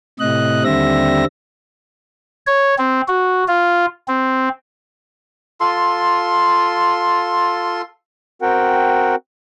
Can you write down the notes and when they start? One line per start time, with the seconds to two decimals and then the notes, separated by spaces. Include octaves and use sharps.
0.20 A2 C3 D#5 F#6
0.64 D#2 D3 G3 C4 E5 A#6
2.47 C#5
2.78 C4
3.08 F#4
3.48 F4
4.08 C4
5.60 F4 A4 C6
8.42 C4 F#4 A#4 F#5 G5